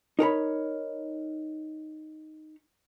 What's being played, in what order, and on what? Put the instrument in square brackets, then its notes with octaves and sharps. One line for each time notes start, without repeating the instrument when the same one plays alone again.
[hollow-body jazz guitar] D#4 A#4 C#5 B5